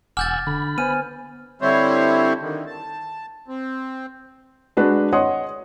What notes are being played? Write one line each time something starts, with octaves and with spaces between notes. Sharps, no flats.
E1 F#5 G#5 D6 E6 F6 G6 A6
D3 B5
B3 C5 G#5 F6 D#7
D3 G3 C4 E4 C5 C#5
D3 D#3
A5
C4
G#3 D4 F#4 B4
C#5 D#5 F#5 C6 D#6